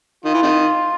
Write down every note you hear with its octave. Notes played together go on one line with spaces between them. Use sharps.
D#3 F4
E3
C3 D#3